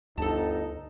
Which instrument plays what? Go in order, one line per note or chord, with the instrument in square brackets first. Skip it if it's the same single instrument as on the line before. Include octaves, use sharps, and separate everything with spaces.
[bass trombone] G1 [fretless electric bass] D2 [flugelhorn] D#4 [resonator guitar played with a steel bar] A4 A5